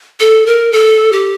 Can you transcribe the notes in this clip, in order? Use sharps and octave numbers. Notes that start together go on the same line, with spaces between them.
A4
A#4
A4
G4